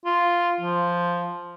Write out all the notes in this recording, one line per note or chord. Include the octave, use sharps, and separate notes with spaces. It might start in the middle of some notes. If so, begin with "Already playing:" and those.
F4
F3